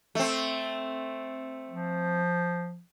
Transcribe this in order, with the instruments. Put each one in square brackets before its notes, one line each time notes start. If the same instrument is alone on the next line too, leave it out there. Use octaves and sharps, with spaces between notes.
[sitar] A3 C4
[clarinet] F3